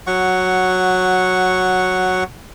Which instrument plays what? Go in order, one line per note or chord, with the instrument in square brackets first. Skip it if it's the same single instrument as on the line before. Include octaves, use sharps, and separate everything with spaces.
[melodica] F#3 F#5 C#6